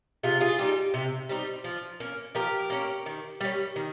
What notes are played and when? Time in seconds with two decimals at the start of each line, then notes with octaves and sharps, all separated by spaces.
0.23 C3 F4 G#4
0.41 F4 G#4
0.58 G3 C4 D#4 G4
0.94 C3
1.29 G3 C4 D#4
1.64 F3
2.00 A#3 C#4
2.35 F3 G4 A#4
2.70 A#3 C#4
3.06 D#3
3.41 G3 C#4
3.76 D#3